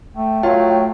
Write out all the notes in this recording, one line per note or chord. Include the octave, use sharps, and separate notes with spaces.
A3 G5
F#3 A3 F4